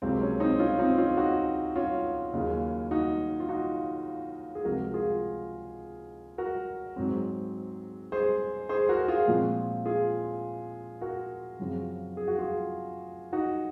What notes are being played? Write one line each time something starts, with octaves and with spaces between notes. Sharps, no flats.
C#2 C3 F#3 A#3 C4
C#4
C4 D#4
C#4 F4
C4 D#4
C#4 F4
D#4 F#4
C#4 F4
D#2 C#3 F#3 A#3
D#4 F#4
F4
D#4 F#4
G#4
C#2 C3 F3 C4 F#4 A#4
F4 G#4
F#4 A#4
G#2 F#3 C4
G#4 C5
G#4 C5
F#4 A#4
F4 G#4
A#2 F3 G#3 C4
F4 G#4
F#4 A#4
F#2 C#3 F3 C4
G#4
F#4
F4 G#4
D#4 F#4